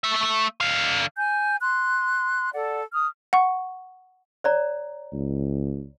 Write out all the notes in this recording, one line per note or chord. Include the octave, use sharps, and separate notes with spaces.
A3 E5
D3 F5
G#5 G6
C6 F#6
A4 D5 F#5
D#6 F6
F#5 C#6
C#5 D5 A#5
C#2